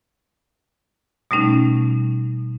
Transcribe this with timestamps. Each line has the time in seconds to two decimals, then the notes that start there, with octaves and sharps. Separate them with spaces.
1.31 B2 G3 A3 C#4 D#4